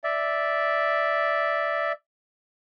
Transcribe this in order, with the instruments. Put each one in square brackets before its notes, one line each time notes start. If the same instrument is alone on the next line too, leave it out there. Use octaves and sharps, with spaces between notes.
[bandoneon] D5 E5